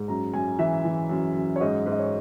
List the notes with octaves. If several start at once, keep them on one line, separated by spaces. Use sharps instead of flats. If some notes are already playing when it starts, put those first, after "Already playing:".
Already playing: G#2
F#2 A#5
F#2 G#5
E3 E5
E3
F#2
F#2
C#5
G#2 D#5
G#2
D#5
C#5